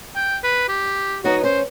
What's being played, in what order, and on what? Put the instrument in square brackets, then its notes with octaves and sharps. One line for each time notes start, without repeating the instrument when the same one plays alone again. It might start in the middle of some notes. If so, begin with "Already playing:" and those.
[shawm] G5
B4
G4
[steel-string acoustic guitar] F#3 B3 D#4 [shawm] F#4
[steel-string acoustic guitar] C#4 [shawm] C5